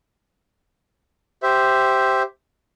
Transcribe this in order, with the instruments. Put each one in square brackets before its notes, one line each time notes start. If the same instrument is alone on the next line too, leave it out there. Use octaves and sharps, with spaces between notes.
[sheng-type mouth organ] G4 C5 E5